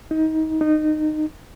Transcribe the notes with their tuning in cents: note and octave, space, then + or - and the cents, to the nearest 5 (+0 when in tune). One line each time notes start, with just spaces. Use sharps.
D#4 +25
D#4 -20